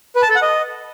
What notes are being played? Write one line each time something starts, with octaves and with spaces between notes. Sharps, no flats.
B4
A5
A4
F#5
D#5